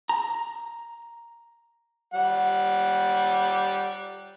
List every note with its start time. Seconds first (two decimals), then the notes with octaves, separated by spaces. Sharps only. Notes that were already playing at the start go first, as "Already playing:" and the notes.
0.09 A#5
2.14 G3 F#5